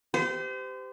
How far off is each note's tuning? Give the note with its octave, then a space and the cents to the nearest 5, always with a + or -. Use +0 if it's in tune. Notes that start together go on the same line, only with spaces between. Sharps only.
G4 +0 C5 -35